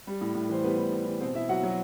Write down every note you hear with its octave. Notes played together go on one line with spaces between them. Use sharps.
G3
A2
A2
E3 C5
G3 B3 B4
A2
A2
E3
B2 C4 C5
B2 E4 E5
F#3 F#4 F#5
F#3